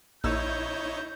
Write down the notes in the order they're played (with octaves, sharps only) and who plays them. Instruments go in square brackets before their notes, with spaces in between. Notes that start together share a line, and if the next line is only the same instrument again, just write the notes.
[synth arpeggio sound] A#1 E6 [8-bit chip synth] D#4 E4 C#5 [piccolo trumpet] G6